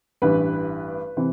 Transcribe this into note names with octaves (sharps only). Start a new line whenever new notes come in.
A1 G2 E3 B4
C3 E3